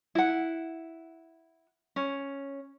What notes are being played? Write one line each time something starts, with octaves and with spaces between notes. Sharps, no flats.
E4 F#5
C#4